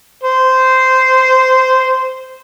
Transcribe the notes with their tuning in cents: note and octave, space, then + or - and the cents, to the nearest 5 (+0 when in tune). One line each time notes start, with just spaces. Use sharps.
C5 -10